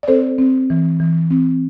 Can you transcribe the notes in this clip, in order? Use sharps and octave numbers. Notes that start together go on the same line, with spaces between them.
D5
C4 A4 C5
C4
E3
E3
C4